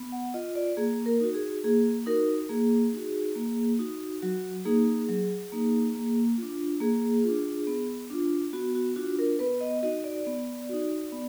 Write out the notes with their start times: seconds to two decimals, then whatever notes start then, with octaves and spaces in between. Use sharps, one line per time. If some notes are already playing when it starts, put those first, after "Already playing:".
Already playing: B3
0.12 F#5
0.34 F4 D#5
0.55 D5
0.77 A#3 G#4
1.06 A#4
1.20 D#4 F#4
1.34 G#4
1.64 A#3 G#4
2.06 D#4 F#4 A#4
2.49 A#3 G#4
2.93 D#4 F#4
3.35 A#3
3.79 D#4 F#4
4.22 F#3 F#4
4.65 A#3 D#4 G#4
5.09 F#3
5.52 A#3 D#4
5.95 A#3
6.38 D4 F4
6.80 A#3 G#4
7.24 D4 F4
7.67 B3
8.10 D4 F4
8.53 B3 F#4
8.75 F#4
8.96 D4 F4 F#4
9.19 A#4
9.39 B3 B4
9.61 D#5
9.83 D#4 F#4 D#5
10.04 D5
10.26 B3
10.69 D#4 F#4
11.12 B3